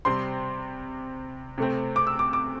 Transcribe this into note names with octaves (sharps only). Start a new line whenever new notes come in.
C3 G3 C4 C6
C3 A3 C4
D6
E6
D6
D6